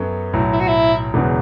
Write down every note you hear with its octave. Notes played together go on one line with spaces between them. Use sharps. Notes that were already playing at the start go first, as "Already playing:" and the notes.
Already playing: F#2 F#3 B3 A4 C#5
B1 A2 F#3
E4
F#4
E4
E1 E2 C#3 F#3